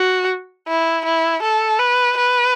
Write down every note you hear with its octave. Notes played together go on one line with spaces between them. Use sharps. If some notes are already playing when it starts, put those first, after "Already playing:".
Already playing: F#4
E4
E4
A4
B4
B4